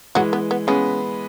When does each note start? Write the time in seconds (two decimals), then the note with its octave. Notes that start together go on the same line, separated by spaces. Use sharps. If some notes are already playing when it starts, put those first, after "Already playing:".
0.15 E3 F#3 G#3 F#4
0.33 B3
0.51 B3
0.67 C#3 G#3 B3 C#4